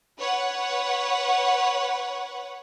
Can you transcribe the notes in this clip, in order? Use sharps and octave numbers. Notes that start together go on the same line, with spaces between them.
B4 C#5 F#5